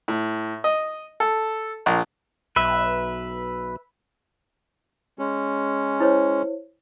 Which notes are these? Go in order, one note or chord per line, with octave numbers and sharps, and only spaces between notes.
A2
D#5
A4
A#1
B1 B4 E5
G#3 C#4
E4 C5 C#5